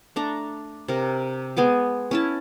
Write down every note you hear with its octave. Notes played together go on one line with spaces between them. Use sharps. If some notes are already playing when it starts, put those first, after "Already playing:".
A3 D4 A#5
C3 A#4
G#3 B3 G#5 D6
C#4 E4 A5